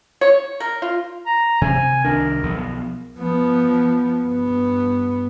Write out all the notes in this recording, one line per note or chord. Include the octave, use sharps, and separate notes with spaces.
C#5
A#4
F4
A#5
C3 G#5
C2 D#3 D4 A#4
B1 F3 B3
F3 B3
G2 B3